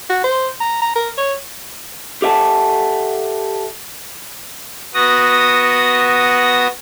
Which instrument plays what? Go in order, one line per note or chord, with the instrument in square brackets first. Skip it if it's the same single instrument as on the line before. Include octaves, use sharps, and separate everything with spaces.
[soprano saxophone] F#4
C5
A#5
A#5
A#4
C#5
[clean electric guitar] G4 A4 E5 F#5 A5
[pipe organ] B3 F#4 D#6 A#6